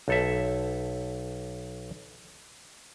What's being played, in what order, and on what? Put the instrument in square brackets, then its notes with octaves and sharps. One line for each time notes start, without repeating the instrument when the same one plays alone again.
[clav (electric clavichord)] B1 A4 E5